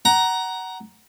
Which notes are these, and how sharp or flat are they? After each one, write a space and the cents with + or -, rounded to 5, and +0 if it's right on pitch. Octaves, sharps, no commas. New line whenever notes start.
F#5 +20 A#5 +10